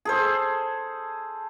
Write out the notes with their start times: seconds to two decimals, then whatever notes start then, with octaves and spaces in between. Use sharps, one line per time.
0.05 G#4 A4 C5